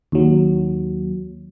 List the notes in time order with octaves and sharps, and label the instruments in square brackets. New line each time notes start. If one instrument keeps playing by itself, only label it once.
[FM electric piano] D#2 F#3